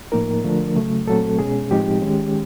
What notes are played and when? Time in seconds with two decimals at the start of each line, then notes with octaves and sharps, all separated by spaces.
0.12 A2 F3 A#3 D#4 A#4
0.43 D3 F3 A3 D4
0.75 C#3 F#3 A3
1.07 A#2 F#3 A3 C4 A4
1.39 B2 G#3 C#4 G#4
1.71 A2 F3 G#3 C4 D#4 G4
2.02 D#3 G#3 C#4